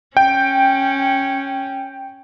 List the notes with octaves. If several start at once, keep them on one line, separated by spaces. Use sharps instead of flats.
C#4 G5